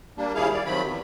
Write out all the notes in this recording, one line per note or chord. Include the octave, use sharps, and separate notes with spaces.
G3 A#3 D4
D#2 G3 E4 G#4 F5
D5
C3 D#3 F3 F#3 B5
E2